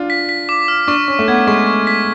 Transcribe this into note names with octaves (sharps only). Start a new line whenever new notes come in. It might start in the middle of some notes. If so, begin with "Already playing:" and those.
Already playing: D4 F4
B6
B6
D6
F6
D4 C#6
C#4 C#6
A3
B3 G#6
G#3 C#6
C#6
B6